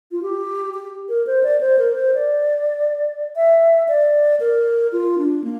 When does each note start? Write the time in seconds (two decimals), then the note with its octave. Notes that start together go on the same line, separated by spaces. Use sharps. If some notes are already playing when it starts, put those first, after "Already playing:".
0.12 F4
0.22 G4
0.74 G4
1.09 A#4
1.27 C5
1.43 D5
1.61 C5
1.78 A#4
1.95 C5
2.14 D5
3.36 E5
3.88 D5
4.40 A#4
4.92 F4
5.18 D4
5.44 A#3